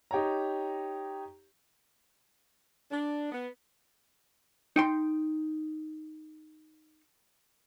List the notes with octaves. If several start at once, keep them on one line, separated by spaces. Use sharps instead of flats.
D#4 G4 C#5 A#5
D4
B3
D#4 G5 C6